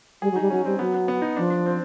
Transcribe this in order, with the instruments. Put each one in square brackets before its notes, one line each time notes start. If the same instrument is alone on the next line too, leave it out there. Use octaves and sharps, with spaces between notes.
[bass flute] G3 [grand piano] G#4
[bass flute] F#3
[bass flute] G3 [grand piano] D#4
[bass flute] F#3 [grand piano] C#4
[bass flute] G3 [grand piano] C4
[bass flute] F#3 [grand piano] B3
[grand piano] B3
B3
D#4
[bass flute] F3 [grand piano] D4
[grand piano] D4
C4